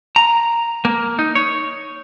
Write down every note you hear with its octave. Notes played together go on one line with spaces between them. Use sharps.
A#5
A#3
D#4
C#5